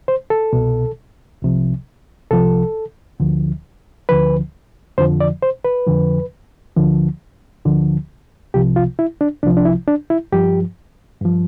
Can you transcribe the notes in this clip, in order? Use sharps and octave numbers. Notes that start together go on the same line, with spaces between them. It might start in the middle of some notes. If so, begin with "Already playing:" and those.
C5
A4
C2 B2
C2 C3 F3
C2 C3 F3 A4
D2 D3 F3
D2 D3 F3 B4
F2 D3 F3 C5
D5
C5
B4
F2 D3 F3
D2 D3 F3
D2 D3 F3
C2 C3 F3 G4
F4
E4
D4
C2 C3 F3 D4
D4
E4
D4
E4
G2 F3 G4
G2 F3